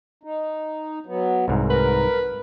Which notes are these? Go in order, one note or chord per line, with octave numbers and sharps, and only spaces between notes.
D#4
F#3 B3
C2 G#2
A#4 B4